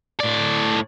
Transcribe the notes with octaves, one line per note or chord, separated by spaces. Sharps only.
A2 D5